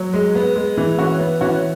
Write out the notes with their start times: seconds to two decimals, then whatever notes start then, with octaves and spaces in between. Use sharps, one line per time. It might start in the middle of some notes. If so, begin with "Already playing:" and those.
Already playing: F#3
0.14 G#3
0.35 B3
0.56 G#3
0.77 E3
0.98 E3 C#4 F#4
1.20 B3
1.41 E3 C#4 F#4